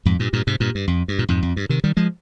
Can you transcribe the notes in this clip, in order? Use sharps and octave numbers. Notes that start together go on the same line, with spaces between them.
F2 G#2
G2 A#2
G2 A#2
G#2 C3
G2 A#2
G2
F2
G2
A#2
F2 G#2
F2
G2
C3 D#3
D#3 G3
F3 G#3